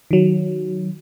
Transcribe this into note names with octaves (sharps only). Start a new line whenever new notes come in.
D#3 F#3